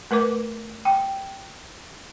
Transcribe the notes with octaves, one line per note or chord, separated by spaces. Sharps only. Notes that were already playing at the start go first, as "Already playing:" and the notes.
A3 A#4 B4 D6
G5